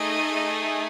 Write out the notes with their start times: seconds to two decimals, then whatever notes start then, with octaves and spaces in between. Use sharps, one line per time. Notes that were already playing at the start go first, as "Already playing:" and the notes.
Already playing: A3 D#4 G#4 D#5